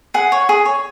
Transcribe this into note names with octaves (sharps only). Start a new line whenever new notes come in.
G#4 F#5
C#5
G#4
C#5